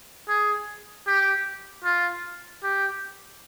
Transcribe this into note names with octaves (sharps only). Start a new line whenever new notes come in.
G#4
G4
F4
G4